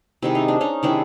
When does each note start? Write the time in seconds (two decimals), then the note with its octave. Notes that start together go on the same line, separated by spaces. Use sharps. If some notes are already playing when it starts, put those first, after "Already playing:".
0.22 C3 D#3 G#3 E4
0.35 D#4
0.48 D4
0.61 C#4 D#4
0.83 C3 D#3 G#3 D4 E4